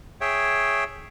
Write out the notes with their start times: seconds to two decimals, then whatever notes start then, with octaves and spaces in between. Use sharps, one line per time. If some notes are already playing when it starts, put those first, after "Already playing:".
0.21 G#4 C#5 E5 G5